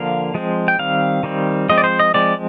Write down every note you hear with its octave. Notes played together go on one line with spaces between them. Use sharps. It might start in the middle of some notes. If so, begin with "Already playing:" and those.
Already playing: D3 F3 A#3 F5
F3 G#3 C4
G5
D#3 G3 C4 F5
D#3 G3 C4
F3 G#3 C4 D#5
D5
C5
D#5
F3 G#3 C4 D5